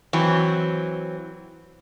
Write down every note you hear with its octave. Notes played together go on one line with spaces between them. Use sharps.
E3 F#3 C4